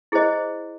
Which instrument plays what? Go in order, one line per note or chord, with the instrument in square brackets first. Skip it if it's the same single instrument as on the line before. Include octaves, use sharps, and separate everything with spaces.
[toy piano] E4 G#4 C5 D#5